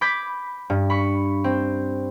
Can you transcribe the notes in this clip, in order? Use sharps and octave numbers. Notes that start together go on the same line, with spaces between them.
B5 D6 G6 G#6 B6
G2
B5 C#6
C4